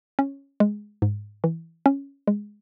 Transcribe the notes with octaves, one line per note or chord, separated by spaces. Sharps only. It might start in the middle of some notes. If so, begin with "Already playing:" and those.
C#4
G#3
G#2
E3
C#4
G#3